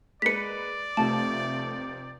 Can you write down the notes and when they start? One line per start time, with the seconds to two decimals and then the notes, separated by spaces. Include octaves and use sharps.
0.22 G#3 A#3 B4 D5 B6 C#7
0.97 F1 C3 A3 F4 A5